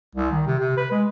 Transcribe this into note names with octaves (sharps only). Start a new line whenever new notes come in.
C2
D#3
C3
C3
B4
G#3